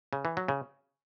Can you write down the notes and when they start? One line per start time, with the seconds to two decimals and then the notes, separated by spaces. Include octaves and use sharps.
0.13 C#3
0.25 E3
0.37 F#3
0.48 C#3